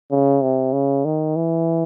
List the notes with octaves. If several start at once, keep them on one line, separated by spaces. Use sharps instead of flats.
C#3
C3
C#3
D#3
E3